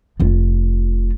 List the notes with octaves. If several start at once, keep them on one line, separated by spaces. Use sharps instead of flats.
F1 F4